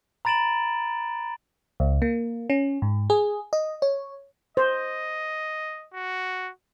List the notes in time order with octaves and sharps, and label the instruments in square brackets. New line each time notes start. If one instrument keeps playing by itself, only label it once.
[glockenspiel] A#5 B5 A6 D7 E7 F#7
[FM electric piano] C#2
A#3
C#4
G#2
G#4
D#5
C#5
[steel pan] C5 [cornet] D#5
[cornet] F#4